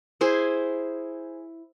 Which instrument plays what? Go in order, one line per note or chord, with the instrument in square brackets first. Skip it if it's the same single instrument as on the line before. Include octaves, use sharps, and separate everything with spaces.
[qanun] E4 G#4 C5 G#5